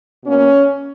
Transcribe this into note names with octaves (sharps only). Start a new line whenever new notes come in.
B2 A#3 C#4